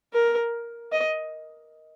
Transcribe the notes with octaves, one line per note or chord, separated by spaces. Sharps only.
A#4
D#5